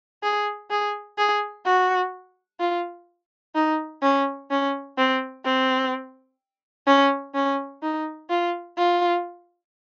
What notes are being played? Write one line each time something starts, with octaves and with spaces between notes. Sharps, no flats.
G#4
G#4
G#4
F#4
F4
D#4
C#4
C#4
C4
C4
C#4
C#4
D#4
F4
F4